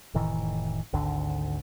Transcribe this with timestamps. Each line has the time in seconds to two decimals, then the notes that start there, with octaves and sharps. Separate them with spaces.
0.14 F1 A2 D#3 E3
0.93 G#1 D2 D3